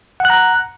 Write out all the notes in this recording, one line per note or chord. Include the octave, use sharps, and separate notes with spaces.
F#5 A#5 F#6